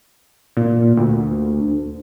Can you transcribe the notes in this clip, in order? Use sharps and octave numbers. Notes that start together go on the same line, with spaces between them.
A#2
D2